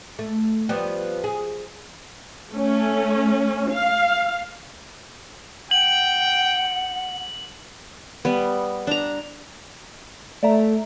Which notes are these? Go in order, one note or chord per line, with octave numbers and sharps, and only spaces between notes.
A3
F3 G3 B3
G#4
A3 C#4
F5
F#5 G5 F#7
G3 B3
D4 A#5
A3 D5 E5 A#5